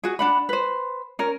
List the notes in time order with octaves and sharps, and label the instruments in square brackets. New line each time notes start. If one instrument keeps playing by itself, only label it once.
[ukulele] F#4 G#4
D4 F#5 B5
B4 C5
C#4 A#4